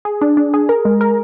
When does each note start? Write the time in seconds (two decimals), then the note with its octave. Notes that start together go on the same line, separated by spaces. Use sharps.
0.05 G#4
0.21 D4
0.37 D4
0.54 G#4
0.69 A#4
0.85 G#3
1.01 A#4